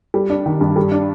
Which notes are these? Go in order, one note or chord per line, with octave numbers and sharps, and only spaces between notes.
G3
D4
D#3
G2
G3
D4